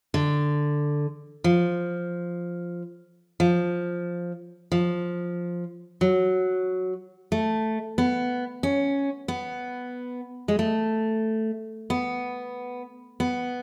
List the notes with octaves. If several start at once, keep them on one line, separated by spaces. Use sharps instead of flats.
D3
F3
F3
F3
F#3
A3
B3
C#4
B3
G#3
A3
B3
B3